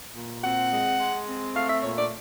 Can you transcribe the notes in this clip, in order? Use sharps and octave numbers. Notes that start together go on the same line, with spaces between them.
A#2
C4 F#5
G#3
G#3
C4
A3 F5
E5
A#2 C#5
D5